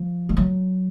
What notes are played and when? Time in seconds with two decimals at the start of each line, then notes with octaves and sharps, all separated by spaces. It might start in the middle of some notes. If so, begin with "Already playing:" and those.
Already playing: F3
0.29 G3
0.37 F#3